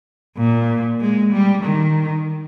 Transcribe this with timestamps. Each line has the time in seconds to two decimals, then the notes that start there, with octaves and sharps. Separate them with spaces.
0.37 A#2
1.00 G#3
1.33 G3
1.64 D#3